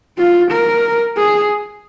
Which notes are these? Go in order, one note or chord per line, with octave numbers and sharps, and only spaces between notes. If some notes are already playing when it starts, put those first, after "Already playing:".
F4
A#4
G#4